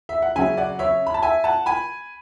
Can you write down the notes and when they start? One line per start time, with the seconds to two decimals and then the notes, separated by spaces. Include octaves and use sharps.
0.09 E5
0.22 F#5
0.36 C#3 F#3 C#4 E5 G#5
0.57 D5 F#5
0.79 C#5 E5
1.06 B5
1.14 A5
1.23 E5 G#5
1.44 F#5 A5
1.66 G#5 B5